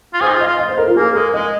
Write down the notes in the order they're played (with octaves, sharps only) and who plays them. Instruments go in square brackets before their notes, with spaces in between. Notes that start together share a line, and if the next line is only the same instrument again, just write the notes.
[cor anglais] F4
[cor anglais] G#4 [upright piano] C5
[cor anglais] D#4
F4
[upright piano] D#5
[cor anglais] F4
[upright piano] D#5
C5
A#4
F4
[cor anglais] A#3 [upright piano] G#4
[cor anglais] G#3 [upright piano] A#4
[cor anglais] G#3 [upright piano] D#5